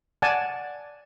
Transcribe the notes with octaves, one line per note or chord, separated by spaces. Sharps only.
D5 F#5 G#5 A5